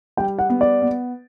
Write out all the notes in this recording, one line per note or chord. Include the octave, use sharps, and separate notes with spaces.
G3 G5
F#5
B3
D5
B3